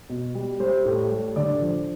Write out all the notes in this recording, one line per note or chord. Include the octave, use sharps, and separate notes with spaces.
B2
G3
G3 C5
A2
G3
D3 D5
F3